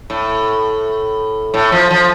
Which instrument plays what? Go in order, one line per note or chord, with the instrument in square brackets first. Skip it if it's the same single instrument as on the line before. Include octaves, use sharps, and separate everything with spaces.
[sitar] A2
A2
F3
F3